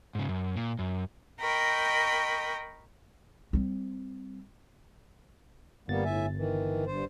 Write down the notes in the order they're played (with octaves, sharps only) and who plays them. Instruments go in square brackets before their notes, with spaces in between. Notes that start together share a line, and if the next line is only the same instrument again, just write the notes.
[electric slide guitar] G#2 C#3
F#2
A#2
F#2
[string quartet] A#4 D#5 G5 B5 C#6 G6
[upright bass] G3 C4
[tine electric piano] G1 A6 [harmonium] G3 A#3 B3
[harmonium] A2 E5 G#5
D#3 E3
G2 C5